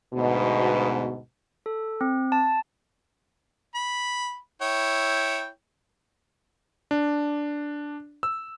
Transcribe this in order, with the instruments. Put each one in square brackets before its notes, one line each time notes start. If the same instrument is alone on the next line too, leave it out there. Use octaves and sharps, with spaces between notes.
[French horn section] D2 G#2 B2
[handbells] A4
C4
A5
[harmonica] B5
E4 C#5 G5
[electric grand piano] D4
E6